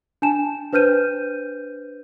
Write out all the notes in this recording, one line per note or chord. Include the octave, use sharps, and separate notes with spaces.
D4 G#5 A5 E7
D4 B4 C5 F6 G6 D#7